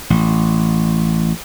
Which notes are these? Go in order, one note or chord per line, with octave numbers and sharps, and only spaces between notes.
A1